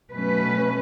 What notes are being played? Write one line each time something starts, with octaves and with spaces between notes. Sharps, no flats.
B2 F#3 A3 C#4 B4